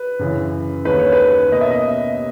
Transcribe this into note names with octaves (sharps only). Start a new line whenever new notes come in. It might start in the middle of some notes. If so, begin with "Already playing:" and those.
Already playing: B4
F#2 C#3 E3
D#2 D#3 G#3 C#4 B4
C#5
B4
B2 A#3 C#4 D#5
E5
D#5